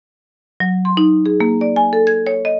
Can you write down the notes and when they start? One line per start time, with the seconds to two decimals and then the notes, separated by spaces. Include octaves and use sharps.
0.60 F#3
0.85 C6
0.97 D#4
1.26 G#4
1.40 A#3
1.61 D5
1.76 G#5
1.93 A4
2.07 G#6
2.27 C#5
2.45 D#5